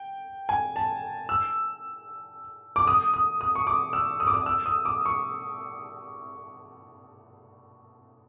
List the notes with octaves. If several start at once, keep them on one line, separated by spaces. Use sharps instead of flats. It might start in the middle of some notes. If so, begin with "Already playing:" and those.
Already playing: G5
G#5
A5
E6
D6
D#6
D#6
D#6
C#6
D6
E6
D#6
D6
D#6
E6
D#6
D6
C#6